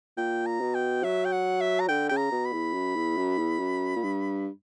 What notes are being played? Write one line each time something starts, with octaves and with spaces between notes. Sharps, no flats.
A#2 G5
A#5
B2
G5
F#3 E5
G5
F#5
E5
A#5
D3 G5
C#3 G5
A#5
B2
B5
E2
F#2
E2
F#2
E2
F#2
A#2
G2